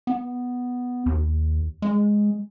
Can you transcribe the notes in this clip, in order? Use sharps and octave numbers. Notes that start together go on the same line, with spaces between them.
B3
D#2
G#3